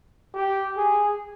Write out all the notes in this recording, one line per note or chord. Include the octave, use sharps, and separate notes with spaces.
G4
G#4